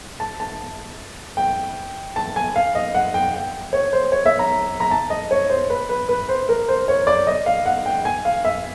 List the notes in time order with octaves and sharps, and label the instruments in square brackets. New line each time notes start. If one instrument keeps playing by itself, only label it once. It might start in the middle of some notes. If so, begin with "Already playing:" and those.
[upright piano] A5
A5
G5
A5
G#5
F5
D#5
F#5
G5
G5
C#5
C5
C#5
E5
A#5
A#5
A5
D#5
C#5
C5
B4
B4
B4
C5
A#4
C5
C#5
D5
D#5
F5
F#5
G5
G#5
F5
E5